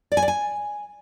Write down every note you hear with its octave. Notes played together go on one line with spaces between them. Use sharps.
D5
G#5
D5
G#5